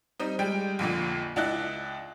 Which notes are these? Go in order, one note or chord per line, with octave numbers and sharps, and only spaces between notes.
G3 C4 D#4
G3 G#3 G5
A#1 F2 A#2 D3
C#2 D4 E4 D#5 F#6